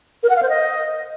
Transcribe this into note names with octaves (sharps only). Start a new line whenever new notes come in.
A#4
F#5
F5
C5
D#5